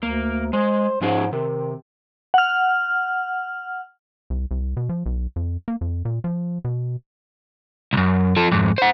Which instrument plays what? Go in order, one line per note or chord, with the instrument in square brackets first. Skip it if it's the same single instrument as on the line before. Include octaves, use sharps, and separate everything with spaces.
[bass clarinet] D2 [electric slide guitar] A#3
[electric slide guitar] G#3 [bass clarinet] C5
[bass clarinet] G#2 [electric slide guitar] F3 C#4 G#4
[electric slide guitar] C3 [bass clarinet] D#3
[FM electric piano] F#5 F6
[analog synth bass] C2
C2
B2
F3
B1
F2
A#3
F2
A#2
F3
B2
[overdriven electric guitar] C2 F#2
F3 A4
F2 G#2
C5 F#5